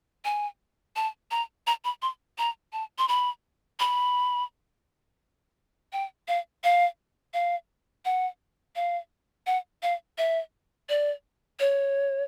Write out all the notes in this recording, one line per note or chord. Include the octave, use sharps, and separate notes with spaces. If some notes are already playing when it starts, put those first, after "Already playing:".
G#5
A5
A#5
A#5
B5
C6
A#5
A5
C6
B5
B5
G5
F5
F5
F5
F#5
F5
F#5
F5
E5
D5
C#5